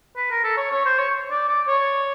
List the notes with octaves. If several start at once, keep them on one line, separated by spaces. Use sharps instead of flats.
B4
A#4
A4
C#5
C#5
C5
C#5
D5
D5
C#5